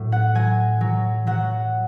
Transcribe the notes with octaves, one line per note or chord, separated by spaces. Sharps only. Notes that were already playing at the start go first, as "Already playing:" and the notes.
Already playing: A2 F#3
F#5
F#3 G#5
F#3
F#3 F#5